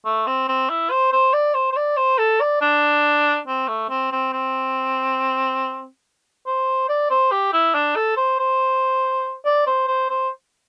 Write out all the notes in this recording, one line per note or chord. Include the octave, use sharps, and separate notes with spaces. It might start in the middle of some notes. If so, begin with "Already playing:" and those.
A3
C4
C4
E4
C5
C5
D5
C5
C5
D5
C5
A4
D5
D4
C4
A3
C4
C4
C4
C5
D5
C5
G4
E4
D4
A4
C5
C5
D5
C5
C5
C5